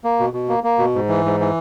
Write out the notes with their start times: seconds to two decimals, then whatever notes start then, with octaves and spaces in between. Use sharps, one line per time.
0.04 A#3
0.19 B2
0.33 B2
0.49 A#3
0.64 A#3
0.79 B2
0.95 G#2
1.09 E3
1.25 G#2
1.40 E3